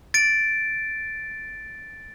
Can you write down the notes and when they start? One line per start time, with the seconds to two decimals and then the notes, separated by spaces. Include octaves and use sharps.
0.14 A6 D7